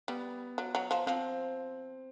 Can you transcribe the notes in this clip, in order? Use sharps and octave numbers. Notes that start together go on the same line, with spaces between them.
G3 B3
F#3
F#3
F3
F3 C4